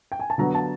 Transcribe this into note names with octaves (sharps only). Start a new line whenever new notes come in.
G5
G#5
A5
D3 F#3 B3 A#5
A5